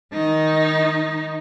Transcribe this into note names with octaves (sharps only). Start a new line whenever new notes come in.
D#3 D#4